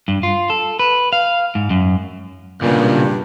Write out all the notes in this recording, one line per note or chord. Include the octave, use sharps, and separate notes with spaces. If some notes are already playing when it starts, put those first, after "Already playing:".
G2
F4
A4
B4
F5
G#2
F#2
B1 G2 A#2 C#3